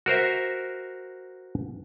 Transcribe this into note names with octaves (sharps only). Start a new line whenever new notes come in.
F#4 A#4 C5 E5